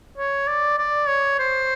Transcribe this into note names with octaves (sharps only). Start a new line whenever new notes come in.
C#5
D5
D5
C#5
C5